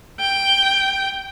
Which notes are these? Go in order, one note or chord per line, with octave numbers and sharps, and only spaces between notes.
G5